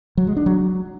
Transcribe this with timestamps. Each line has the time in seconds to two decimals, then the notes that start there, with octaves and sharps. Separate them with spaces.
0.17 F#3
0.27 G#3
0.37 D4
0.46 F#3